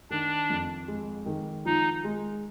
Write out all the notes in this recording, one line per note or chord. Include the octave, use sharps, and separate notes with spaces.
D#3 D4
F2
G#3
D#3
F3 D#4
G#3